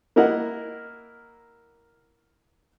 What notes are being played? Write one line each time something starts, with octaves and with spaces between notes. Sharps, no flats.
A#3 E4 A#4 D#5 F#5